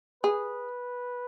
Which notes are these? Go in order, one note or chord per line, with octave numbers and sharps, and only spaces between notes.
G#4 B4